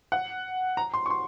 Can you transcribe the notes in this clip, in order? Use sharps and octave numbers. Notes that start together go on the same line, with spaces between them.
F#5
A#5
C6
C#6
C6